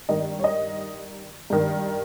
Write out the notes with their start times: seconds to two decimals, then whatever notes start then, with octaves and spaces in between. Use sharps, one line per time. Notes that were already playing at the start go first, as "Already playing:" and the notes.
0.09 G2 D#3 D#5
0.40 C#5
0.44 D#5
1.50 G2 D#3